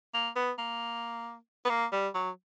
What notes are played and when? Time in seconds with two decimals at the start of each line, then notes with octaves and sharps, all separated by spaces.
0.14 A#3
0.36 B3
0.58 A#3
1.65 B3
1.70 A#3
1.92 G3
2.14 F#3